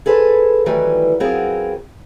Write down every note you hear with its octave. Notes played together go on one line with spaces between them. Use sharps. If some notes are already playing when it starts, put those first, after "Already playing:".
G#4 A4 B4 C5
D#3 E3 F#3 G3 A3 B4
F#3 B3 C4 F4 G#4 A#4